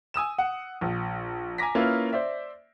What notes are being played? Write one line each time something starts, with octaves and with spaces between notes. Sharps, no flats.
G#5 D#6 E6 E7
F#5
A#1
G#5 A#5 D6 A#6 B6
A#3 C#4 E4 F4 B4
C5 D5 E5